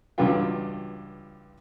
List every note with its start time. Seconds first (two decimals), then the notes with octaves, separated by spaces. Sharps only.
0.18 C#2 G2 E3 F#3 F4 G5